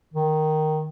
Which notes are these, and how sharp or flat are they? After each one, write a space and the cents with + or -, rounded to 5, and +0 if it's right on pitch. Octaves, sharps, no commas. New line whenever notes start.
D#3 -5